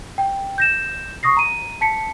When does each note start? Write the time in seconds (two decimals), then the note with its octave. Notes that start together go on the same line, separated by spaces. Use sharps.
0.18 G5
0.58 G6 A#6 E7
1.23 C#6 D#6 A#6 C7
1.37 A#5 D#7
1.81 A5 B6 C#7